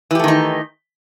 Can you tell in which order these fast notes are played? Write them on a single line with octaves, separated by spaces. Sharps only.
E3 G4 A3 D#3 D#4